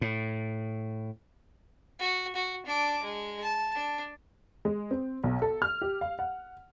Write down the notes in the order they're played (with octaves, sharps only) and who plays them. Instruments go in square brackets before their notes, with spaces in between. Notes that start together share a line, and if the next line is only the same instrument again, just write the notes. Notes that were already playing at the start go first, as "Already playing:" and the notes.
[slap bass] A2
[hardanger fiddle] F#4
F#4
D4 D6
G#3
A5
D4
[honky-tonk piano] G#3
C4
B1
A4
F6
G4
F5
F#5